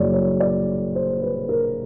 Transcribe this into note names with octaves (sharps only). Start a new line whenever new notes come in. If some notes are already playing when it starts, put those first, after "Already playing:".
Already playing: F#1 F#2 C#5 D5
C#5
D5
C5
B4
A#4